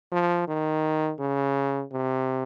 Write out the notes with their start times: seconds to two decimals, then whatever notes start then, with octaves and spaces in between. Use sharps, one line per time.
0.12 F3
0.47 D#3
1.19 C#3
1.92 C3